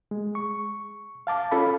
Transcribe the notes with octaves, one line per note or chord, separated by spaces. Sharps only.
G#3
C#6
F5 A5 D6
C#4 F4 A4 F5 B5